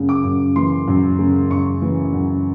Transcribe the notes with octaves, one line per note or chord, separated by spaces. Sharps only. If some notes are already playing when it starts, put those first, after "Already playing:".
Already playing: F#2 C#3
D6
F#2
E3 C6
F#2
C#3
F#2 C#6
E3
F#2